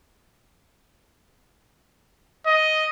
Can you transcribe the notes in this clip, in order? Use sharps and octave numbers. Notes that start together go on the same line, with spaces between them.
D#5